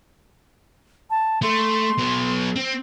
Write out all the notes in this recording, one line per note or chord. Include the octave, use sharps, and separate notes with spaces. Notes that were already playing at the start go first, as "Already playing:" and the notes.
A5
A3 C6
F#3 B3
C4